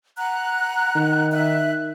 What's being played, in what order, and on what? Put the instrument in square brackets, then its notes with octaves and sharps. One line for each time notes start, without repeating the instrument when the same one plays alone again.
[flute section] F#5 A#5 F#6
[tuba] D#3
[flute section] E5 F#6